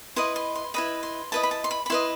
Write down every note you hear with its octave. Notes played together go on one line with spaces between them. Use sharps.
E4 B4 D#5 C6
C6
C6
E4 B4 D#5 B5
C6
E4 B4 D#5 A5
B5
A5
C6
B5
B5
E4 B4 D#5 C6